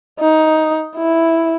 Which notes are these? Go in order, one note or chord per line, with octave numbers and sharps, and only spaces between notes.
D#4
E4